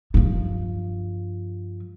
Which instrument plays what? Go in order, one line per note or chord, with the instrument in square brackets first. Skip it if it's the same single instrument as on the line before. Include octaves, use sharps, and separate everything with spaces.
[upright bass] G2 F3